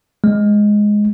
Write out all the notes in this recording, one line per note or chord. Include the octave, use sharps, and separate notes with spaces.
G#3